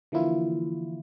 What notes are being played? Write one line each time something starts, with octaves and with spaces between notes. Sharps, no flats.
D3 E3 F3 A#3 E4 F4